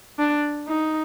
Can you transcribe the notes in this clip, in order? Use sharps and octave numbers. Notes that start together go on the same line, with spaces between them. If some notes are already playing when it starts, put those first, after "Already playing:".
D4
D#4